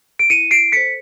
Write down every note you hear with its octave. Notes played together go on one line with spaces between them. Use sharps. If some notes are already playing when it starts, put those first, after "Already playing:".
D7
E4 C#7 D#7
C7 D7
A4 C5 B6 C#7